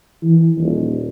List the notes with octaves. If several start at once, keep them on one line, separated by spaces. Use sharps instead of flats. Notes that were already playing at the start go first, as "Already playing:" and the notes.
E3
D#1